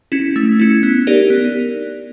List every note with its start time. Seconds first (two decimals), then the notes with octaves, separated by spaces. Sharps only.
0.12 C#4 E4
0.36 A3
0.59 C#4 E4
0.83 B3
1.07 D#4 G4 A#4 D5
1.30 B3